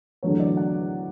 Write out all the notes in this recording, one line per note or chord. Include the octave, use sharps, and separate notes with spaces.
E2 D3 F#3 A3 C#5
D5
F#5